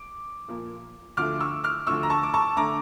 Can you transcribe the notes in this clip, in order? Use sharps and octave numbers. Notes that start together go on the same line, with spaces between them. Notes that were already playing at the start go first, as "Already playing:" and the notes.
Already playing: D6
A#2 F3 A#3
D2 D3 F3 A3 D6 F6
C#6 E6
D6 F6
D2 D3 F3 A3 C#6 E6
A#5
A5 C#6
D6
A5 C#6
D3 A3 A#5 D6